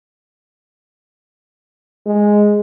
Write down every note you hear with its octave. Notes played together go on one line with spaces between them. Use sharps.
G#3